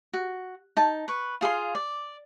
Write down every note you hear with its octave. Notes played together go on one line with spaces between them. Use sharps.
F#4
D#4 A5
B4 C#6
F4 G#4 F5 C6
D5